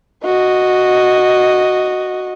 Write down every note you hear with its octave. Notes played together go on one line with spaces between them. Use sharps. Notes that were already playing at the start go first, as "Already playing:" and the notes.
F#4 D#5